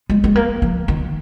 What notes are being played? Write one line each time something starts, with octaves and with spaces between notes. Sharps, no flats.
G#3
G#3
A#3
F3
D#3